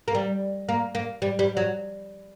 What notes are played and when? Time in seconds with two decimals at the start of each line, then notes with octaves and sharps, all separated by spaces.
0.08 A#3
0.15 G3
0.69 A#3
0.95 A#3
1.22 G3
1.39 G3
1.57 F#3